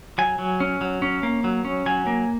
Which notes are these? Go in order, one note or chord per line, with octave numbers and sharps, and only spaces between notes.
F#3 G#5
F#3
C#4
F#3
C#4
A#3
F#3
C#4
F#3 G#5
A#3